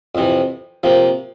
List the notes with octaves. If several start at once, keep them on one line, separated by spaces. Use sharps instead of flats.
F2 C3 E3
C3 F3 A#3